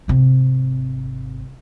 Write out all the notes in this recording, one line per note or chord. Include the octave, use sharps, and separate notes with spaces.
G#1 C3